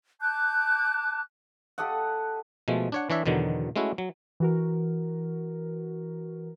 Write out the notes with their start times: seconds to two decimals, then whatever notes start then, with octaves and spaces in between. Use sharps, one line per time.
0.20 A5 D6 F#6 G6
1.78 G4 A4 D#5 F#5
2.68 B2 F3 G#3 A3
2.92 D4 C#5 F#5
3.10 E3 D4 C#5 E5
3.26 E2 B2 D3 D#3 F#3
3.76 G#3 A3 C#4 E4 F#4
3.98 F#3
4.40 E3 F#4 A#4